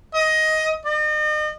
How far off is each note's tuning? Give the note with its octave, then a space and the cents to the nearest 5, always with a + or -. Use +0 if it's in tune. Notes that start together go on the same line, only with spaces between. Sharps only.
D#5 +15
D#5 -40